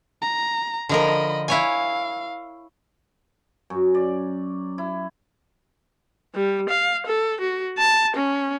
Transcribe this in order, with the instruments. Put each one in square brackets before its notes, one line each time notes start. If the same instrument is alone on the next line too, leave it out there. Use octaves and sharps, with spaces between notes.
[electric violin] A#5
[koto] D3 F3 A#4 [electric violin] D#5 B5
[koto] E4 C#5 G#5 [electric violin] F5
[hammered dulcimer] F#2
D5
E4
[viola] G3
F5
A4
F#4
A5
C#4